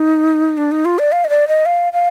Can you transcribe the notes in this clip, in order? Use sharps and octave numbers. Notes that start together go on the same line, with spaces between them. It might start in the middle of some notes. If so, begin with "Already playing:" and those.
Already playing: D#4
D4
D#4
F4
D5
F5
D#5
D5
D#5
F5
F5